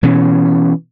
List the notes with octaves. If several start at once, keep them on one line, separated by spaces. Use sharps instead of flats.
B2 E3 C#4